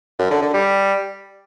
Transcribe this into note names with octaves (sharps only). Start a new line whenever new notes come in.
F#2
D3
D3
G3